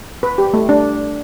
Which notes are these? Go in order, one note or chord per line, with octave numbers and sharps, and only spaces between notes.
B4
G4
A3
D4